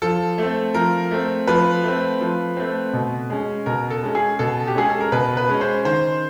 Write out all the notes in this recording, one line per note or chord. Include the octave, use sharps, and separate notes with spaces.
F3 A4
A3 C4
F3 A#4
A3 C4
F3 B4
A3 C4
F3
A3 C4
B2
G#3 C#4
B2 A#4
A4
G#3 C#4
G#4
B2 A4
G4
G#3 C#4 G#4
A4
A#4
B2 B4
B4
G#3 C#4
C5
D#3 C5